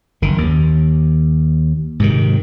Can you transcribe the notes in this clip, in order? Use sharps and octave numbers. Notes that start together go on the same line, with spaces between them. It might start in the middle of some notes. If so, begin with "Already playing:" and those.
F#1 D#3
D#2
G#2 C3 D#3